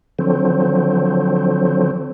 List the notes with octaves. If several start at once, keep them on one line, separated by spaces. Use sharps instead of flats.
D3 F3 F#3 C4